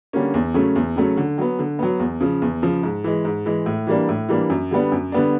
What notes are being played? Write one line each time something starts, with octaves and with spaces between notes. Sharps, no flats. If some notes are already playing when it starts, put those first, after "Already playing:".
D3 G3 A#3 C#4
E2
C#3 F#3 A3 C#4
E2
C#3 F#3 A3 C#4
D3
F#3 B3
D3
F#3 B3
E2
C#3 F3
E2
C#3 F3
G#2
E3 G#3
G#2
E3 G#3
A2
E3 G3 A#3 D4
A2
E3 G3 A#3 D4
F#2
D3 G3 B3 D4
F#2
D3 G3 B3 D4